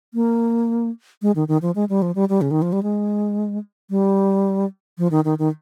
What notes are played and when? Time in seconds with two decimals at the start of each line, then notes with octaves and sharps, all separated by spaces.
0.14 A#3
1.22 G#3
1.36 D#3
1.48 D#3
1.62 F3
1.75 G#3
1.89 G3
2.02 F3
2.15 G3
2.29 G3
2.41 C#3
2.51 D#3
2.62 F3
2.73 G3
2.83 G#3
3.90 G3
4.98 F3
5.11 D#3
5.25 D#3
5.39 D#3